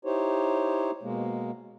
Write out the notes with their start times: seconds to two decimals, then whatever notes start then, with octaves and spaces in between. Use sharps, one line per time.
0.05 D#4 E4 G4 C5 C#5
1.03 B2 G#3 A#3